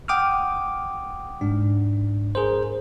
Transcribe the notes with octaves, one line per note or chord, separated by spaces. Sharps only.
F#5 G5 D6 D#6 F6
G#2 D4
G#4 A#4 C5